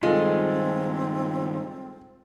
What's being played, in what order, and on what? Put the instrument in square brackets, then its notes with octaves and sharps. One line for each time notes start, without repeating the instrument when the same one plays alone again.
[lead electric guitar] G2 D#3 [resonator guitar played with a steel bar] G#3 [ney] C4 [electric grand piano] F4 A4